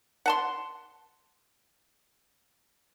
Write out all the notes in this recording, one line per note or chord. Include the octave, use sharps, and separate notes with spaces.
F#5 A5 C6